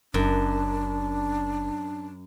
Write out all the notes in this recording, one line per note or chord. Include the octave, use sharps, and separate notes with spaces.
F#1 F#2 D4